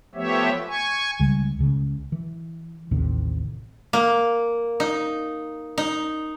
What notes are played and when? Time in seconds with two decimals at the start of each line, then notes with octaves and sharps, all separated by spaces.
0.15 F3 A3 B3 G4 C#5 E5
0.68 G#5 C#6
1.19 C#2 C#3 G3
1.59 C#2 C#3
2.12 E3
2.91 A1 D#2 A2 C3
3.93 A#3
4.80 D#4
5.78 D#4